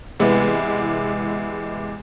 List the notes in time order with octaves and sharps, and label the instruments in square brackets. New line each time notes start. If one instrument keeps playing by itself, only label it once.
[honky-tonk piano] E2 C3 G#3 B3 E4